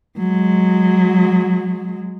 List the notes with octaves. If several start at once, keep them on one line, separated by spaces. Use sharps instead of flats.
F#3 G#3